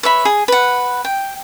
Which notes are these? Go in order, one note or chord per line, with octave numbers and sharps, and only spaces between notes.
B4 C#5 E5 B5
G#4
B4 F#5
G5